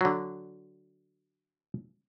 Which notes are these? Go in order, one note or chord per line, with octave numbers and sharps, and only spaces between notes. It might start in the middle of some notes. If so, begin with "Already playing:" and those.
D3 F#3